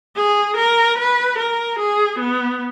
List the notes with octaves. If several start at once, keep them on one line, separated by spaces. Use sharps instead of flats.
G#4
A#4
B4
A#4
G#4
B3